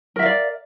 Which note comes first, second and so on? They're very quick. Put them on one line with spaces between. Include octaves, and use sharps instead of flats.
A#4 E5 F5 D5